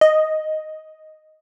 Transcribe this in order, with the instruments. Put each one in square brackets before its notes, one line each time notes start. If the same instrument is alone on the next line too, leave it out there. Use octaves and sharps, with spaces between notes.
[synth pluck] D#5